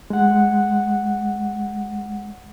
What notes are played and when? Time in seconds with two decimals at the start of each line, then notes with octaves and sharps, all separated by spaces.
0.10 G#3 F#5